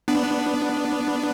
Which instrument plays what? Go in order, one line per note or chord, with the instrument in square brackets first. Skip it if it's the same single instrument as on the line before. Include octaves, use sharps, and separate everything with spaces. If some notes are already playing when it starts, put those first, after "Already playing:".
[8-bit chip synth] B3 D4